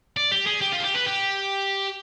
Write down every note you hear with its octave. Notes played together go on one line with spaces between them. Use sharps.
D5
G4
G#4
G4
F4
G#4
G4
B4
G4